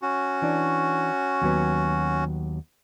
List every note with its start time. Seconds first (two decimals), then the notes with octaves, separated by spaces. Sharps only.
0.02 C#4 F#4
0.42 E3 D4
1.42 D#2 F#3 B3